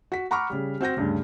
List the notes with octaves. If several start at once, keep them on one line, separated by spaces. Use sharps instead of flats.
F#4 B6
F#5 A#5 B5 C#6 D6 F6
C#3 G3
C4 F#4 G6 A#6
D2 G2 C#3